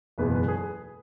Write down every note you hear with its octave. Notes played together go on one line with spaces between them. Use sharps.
F#1 E2 B2 G#3 B4
B4
G#4